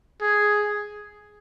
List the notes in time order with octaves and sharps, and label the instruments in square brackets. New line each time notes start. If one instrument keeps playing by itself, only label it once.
[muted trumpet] G#4